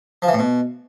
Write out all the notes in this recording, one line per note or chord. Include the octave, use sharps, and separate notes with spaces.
F3
E3
A2
B2